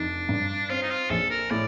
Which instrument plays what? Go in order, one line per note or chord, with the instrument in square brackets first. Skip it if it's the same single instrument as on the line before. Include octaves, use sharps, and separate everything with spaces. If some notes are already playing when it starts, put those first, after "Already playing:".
Already playing: [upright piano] F1 D#4 [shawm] D4
[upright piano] G2
[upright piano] C4 [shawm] F4
[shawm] D#4
F4
[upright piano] A#1 [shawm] A4
[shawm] A#4
[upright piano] A2 [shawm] D5